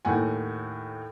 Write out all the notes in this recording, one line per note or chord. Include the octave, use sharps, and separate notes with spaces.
D#2 A2 F#5 G#5